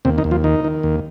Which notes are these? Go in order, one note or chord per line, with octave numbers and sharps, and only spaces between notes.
D#2 C3 C4
D#3 D#4
D#2
F3 F4
D#3 D#4
D#3
D#2